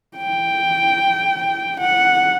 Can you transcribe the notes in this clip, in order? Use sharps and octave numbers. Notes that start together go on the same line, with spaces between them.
G5
F#5